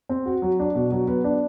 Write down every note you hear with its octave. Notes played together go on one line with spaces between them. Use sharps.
C4
F#4
F#3
D4
B2
F#3
B3
D4